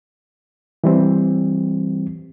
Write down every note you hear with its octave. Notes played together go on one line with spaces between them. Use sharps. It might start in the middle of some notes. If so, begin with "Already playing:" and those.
E3 G3 C4